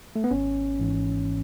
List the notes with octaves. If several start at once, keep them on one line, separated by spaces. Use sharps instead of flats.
A3
B3
G#1 C#4
G#2 E3